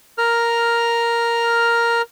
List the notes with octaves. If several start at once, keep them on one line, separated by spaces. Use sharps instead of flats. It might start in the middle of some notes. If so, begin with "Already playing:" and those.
A#4 F6